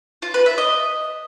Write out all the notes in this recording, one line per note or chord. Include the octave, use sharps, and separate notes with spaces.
F4
B4
E5
D#5